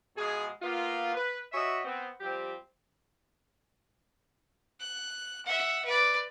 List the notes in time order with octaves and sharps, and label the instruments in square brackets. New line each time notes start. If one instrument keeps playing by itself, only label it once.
[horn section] B2 F3 G#3 G#4
A#3 B3 F4
B4
F#4 C#5 D#5 E5
B3 C4
F3 G3 C4 G4
[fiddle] F#6
E5 F#5
B4 D5